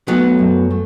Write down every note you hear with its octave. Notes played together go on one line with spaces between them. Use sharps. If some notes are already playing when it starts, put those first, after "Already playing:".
F#3 A3 B3
F#2
A3